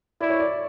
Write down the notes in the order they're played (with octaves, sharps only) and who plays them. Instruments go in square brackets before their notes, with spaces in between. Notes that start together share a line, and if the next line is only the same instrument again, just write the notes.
[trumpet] E4 [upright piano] D5
[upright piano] C#5
D5